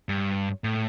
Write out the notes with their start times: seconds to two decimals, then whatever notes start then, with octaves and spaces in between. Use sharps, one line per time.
0.09 G2
0.64 A2